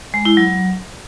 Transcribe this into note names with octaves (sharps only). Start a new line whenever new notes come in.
G#3
E4
F#3